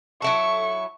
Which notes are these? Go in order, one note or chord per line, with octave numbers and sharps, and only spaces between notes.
F#3 E4 A4 C#6